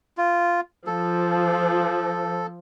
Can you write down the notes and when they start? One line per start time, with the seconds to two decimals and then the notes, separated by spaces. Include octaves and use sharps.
0.18 F4
0.87 F3 A4